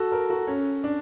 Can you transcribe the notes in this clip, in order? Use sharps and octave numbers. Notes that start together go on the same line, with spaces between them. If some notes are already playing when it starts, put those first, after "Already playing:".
Already playing: F#4 A4
A#4
F#4
C#4
D4